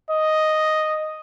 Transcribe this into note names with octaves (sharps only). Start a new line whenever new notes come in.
D#5